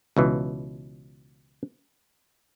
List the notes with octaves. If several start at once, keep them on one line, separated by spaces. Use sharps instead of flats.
C#2 B2 E3